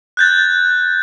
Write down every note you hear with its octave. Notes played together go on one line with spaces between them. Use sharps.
F#6 G6 A6